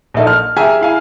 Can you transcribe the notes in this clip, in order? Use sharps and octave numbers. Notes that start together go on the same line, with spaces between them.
A#1 A#3 D#4 A4
F6
G4 G#4 E5 G#5 A#5
E4 F5 G#5